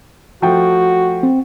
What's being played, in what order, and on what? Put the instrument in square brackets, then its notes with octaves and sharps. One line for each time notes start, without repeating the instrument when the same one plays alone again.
[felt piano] F3 A3 G5 [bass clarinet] F#4
[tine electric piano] C4